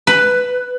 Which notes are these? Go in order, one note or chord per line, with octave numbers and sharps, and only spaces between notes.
B4